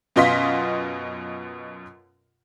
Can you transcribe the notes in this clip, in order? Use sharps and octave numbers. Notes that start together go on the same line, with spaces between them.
F#2 B2 F4 D#5 C6 B6